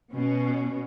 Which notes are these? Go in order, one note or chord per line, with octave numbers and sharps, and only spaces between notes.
B2 C#4